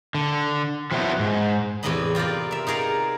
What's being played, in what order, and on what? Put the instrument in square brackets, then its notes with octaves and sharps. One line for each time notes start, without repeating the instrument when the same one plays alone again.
[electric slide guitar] D3
F3 F#3 B3 C4 E4
G#2
[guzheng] E2 A2 C3 B4 D#5 B5
C4 F4 G4 A#4 D5
A#4 E5
D#4 G#4 A#4 D5 F5